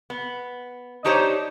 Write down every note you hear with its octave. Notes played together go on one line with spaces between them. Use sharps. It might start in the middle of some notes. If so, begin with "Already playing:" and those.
B3
D4 D#4 G4 C5 C#5